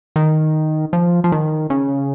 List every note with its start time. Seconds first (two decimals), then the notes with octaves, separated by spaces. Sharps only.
0.16 D#3
0.93 F3
1.24 F3
1.32 D#3
1.70 C#3